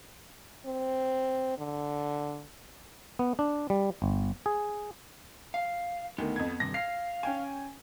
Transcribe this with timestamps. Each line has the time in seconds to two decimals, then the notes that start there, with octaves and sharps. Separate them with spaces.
0.66 C4
1.58 D3
3.19 B3
3.39 D4
3.70 G3
4.02 G1
4.46 G#4
5.54 F5
6.18 D2 D#3 B3
6.36 F2 G#6
6.60 G2 C3 D#3 A#6
6.74 F5 C7
7.23 C#4 G5 G#5